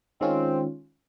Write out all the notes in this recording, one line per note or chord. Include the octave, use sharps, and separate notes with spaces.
D#3 G#3 C4 C#4 F4